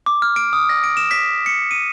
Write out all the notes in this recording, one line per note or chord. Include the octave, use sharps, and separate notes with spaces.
D6
F6
D7
D#6
A#6
D7
E7
B6
C#7
D#7